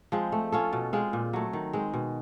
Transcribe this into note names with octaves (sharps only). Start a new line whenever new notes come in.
F3 G#3 C4
A3
C#4 F4 A4
B2
G#3 C4 F4
A#2
F#3 A3
D#3
G#3 C4
B2